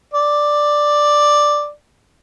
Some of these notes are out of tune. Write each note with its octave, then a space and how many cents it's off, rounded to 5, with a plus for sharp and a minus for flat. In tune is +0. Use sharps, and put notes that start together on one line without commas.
D5 +5